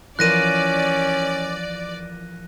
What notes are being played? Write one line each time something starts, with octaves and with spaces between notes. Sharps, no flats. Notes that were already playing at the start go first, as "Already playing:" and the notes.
E3 F3 C#4 A#4 D5 F#6 A#6 D#7